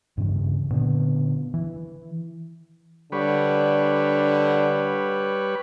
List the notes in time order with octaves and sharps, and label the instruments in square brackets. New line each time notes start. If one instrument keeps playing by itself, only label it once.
[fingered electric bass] G2 C#3 E3
A#2 D3 B3
E3
[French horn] D3 [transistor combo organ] G3 B4 C#5